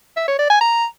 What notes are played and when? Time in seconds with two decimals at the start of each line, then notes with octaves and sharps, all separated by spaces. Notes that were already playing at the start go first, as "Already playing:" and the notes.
0.17 E5
0.28 C#5
0.39 D5
0.50 G#5
0.61 A#5